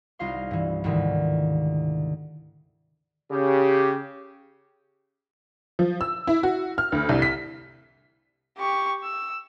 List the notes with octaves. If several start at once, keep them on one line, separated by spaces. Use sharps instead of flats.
C2 D#4 F4 F5 C6
G2 E3
D2 G#2 C3 D#3 E3
C#3 G4
F3
E6
E4
F#4
F6
D2
C2
B6
G4 C#6
E6